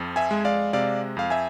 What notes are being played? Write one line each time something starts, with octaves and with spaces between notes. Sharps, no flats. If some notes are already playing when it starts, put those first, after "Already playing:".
Already playing: F2 F3
E5 G#5
G#3
D5 F5
C3 D5 F5
F2 F5
E5 G#5